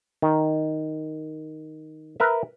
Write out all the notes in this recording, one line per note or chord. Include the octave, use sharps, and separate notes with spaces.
D#3
A#4 B4 E5